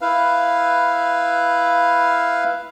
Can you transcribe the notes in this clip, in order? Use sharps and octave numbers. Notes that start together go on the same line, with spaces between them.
E4 B4 F5